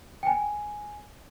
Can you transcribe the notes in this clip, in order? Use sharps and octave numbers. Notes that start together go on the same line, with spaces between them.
G5
G#5